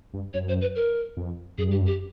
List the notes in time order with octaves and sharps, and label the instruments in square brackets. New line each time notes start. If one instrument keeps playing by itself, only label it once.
[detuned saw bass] G2
[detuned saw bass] F#2 [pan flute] C#5
[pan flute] C5
B4
A#4
[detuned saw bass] F2
[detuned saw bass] F#2 [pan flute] G#4
[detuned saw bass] G2 [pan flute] G4
[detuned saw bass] F#2
[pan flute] G4